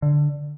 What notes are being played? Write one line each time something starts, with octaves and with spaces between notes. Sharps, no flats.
D3